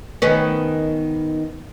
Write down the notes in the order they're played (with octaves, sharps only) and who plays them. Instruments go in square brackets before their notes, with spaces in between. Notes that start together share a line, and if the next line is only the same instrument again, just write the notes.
[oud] D#3 B3 C#4